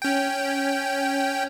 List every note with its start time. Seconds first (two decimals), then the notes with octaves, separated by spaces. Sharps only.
0.02 C#4 G5